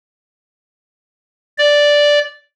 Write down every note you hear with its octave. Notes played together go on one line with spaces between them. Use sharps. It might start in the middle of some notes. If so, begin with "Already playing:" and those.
D5